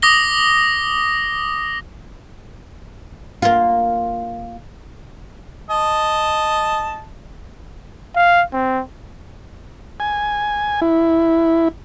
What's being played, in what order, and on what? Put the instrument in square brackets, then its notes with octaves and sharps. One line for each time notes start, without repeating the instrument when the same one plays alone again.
[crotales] D6 D#6 A#6 G7
[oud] A#3 F4
[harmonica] D#5 A5
[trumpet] F5
C4
[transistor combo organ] G#5
E4